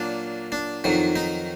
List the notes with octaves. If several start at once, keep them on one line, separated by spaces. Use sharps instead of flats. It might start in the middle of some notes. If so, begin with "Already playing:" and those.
Already playing: A#2 F#3 A#3 D4
D4
F2 D#3 F#3
D#4